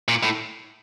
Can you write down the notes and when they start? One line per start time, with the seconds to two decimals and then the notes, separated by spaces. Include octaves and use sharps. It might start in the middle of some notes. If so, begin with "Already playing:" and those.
0.08 A#2
0.23 A2